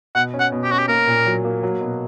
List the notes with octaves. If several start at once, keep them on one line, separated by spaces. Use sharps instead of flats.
B2 F#5
C#4
F#5
B2
G4
C#4 F#4
G4
A#3 A#4
A#2
F#3
A#3
F#3
B2